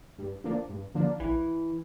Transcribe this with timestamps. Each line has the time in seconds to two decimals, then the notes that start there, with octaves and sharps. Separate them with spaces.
0.18 G2
0.44 D3 F3 A#3 D4
0.69 G2
0.94 D3 F3 A#3 D4
1.20 A#1 E3